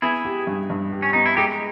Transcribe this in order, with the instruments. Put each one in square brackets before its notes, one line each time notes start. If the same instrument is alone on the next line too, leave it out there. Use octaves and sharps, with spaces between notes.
[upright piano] B3 [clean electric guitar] E4 G#4
[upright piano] G4
G2
G2
G4
[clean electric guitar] C#4
[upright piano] B3 [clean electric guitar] D#4
[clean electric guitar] E4
[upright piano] G#3 [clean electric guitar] D#4 G4